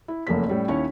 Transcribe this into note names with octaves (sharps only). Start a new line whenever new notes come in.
E4
F#1 F2 A3 A#3 C#4 B6
A2 G3 C#4
D#2 C#4 E4 C#5